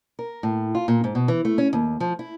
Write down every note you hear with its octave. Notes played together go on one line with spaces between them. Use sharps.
A#4
A2
F4
A#2
G#2
B2
E3
A3
C#4
D#2
F3
E4